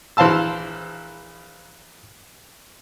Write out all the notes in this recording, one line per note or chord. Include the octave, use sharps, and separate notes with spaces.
A#1 E3 C5 F5 A5 E6